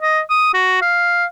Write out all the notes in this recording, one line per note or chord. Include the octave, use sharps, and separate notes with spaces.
D#5
D#6
F#4
F5